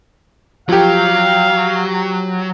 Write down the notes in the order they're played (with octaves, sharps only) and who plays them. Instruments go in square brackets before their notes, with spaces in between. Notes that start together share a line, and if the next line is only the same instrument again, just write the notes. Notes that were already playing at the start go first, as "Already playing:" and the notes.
[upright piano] F3 G4 [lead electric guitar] F#3 [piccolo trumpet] F5